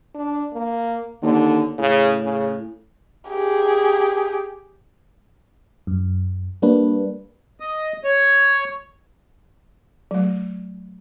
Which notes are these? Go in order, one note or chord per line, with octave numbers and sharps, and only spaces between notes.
D4
A#3
D#2 D3
A2 C#3
C#3
G4 G#4
F#2
G3 A#3 D4 B4
D#5
C#5
F#3 A3